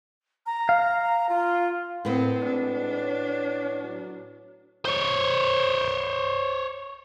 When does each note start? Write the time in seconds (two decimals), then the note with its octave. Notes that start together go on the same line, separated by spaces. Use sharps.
0.46 A#5
0.69 F5
1.29 F4
2.05 A2 B3 C4 A#4 D#5
2.45 G#2 D4
3.01 C#5
3.83 F#3
4.85 C5 C#5